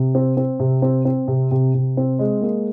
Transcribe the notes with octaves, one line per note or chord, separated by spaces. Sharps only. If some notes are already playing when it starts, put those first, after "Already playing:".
Already playing: C3
C4
C4
C3
C4
C4
C3
C3
C3
C4
G#3
A#3